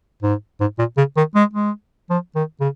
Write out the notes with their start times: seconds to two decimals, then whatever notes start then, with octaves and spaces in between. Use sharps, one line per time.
0.22 G#2
0.60 G#2
0.78 A#2
0.97 C#3
1.17 D#3
1.35 G#3
1.53 G#3
2.10 F3
2.35 D#3
2.60 C#3